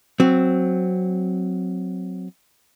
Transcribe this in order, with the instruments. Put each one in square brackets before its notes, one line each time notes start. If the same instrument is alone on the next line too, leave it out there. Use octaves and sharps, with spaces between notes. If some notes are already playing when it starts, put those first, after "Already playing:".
[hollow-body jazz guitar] F#3 C4